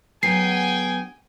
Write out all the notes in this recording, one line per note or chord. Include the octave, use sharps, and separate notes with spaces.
D2 F#3 B3 G#4 G5 G#5 C7